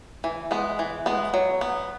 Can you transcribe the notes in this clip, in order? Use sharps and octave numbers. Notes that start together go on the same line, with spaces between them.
E3
G#3 B3
E3
G#3 B3
F#3
B3